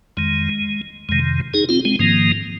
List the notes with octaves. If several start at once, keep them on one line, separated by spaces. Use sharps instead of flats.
F2 D#3 G#3
F2 C3 D#3 G#3
D#4 G#4
C4 F4
G#3 C4
G#2 D#3 F3 A#3